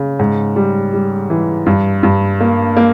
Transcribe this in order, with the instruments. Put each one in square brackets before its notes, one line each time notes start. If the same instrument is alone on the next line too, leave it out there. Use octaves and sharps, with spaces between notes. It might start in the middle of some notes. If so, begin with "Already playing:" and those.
Already playing: [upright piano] C#3
G#2
G3
G3
E3
G2
G2
A#3
A#3